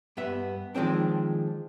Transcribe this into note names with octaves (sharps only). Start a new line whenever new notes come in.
G2 B3 E5
D#3 F3 G#3 C4 D4